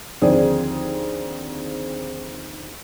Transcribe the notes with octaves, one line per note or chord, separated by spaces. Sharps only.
D#2 D3 F3 C4 G#4 D5